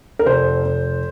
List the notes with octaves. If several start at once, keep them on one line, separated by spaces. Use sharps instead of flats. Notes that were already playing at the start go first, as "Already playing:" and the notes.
A#4
F1 C5
F1